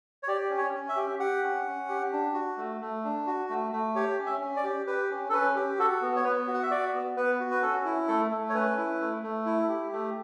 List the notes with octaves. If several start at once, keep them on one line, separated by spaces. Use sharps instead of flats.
C#5
G4 D5
C#4
C#5
C#4
E5
G4
G4 F#5
C#4
C#4
G4
D4
F#4
A3
A3
D4
F#4
A3
A3
G4 C#5
C#4
E5
C#4
D5
G4
G4 B4
C#4
A4
C#4 B4
G4
F#4 A4
B3
C#5
B3 B4
F#4
F#5
E5
F#4 D5
B3
B3 B4
F#4
B4
C#4 A4
E4
A3 A4
A3
C#5
C#4 B4
E4
A3
A3
E4
G4
A3